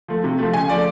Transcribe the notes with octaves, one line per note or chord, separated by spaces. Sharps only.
F3 A3
C3
F3 A3
C#3 G#5
F3 A3 D5